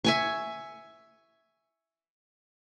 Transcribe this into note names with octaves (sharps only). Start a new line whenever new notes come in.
E5 G#5 C#6